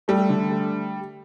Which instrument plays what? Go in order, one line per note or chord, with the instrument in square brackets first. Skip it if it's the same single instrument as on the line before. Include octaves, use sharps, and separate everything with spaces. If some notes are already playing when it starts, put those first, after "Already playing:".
[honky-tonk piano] G3 [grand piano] A3
[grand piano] D3
A3